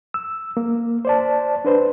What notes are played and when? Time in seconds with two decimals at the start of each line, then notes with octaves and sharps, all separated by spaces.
0.14 E6
0.57 A#3
1.05 C5 D5 A5
1.65 D4 B4 C5